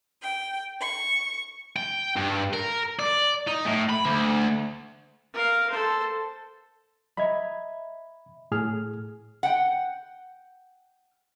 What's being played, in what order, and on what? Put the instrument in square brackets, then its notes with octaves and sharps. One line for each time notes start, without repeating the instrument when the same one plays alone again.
[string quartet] G5
C#6
[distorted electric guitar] G5
G2
A#4
D5
D#4
A2
B5
D2
[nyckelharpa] A#4 F5
A4 C5
[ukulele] D#5 E5 A#5 [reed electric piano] B5 G#6
[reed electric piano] A2 G#4 F6
[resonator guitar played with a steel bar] F#5 G5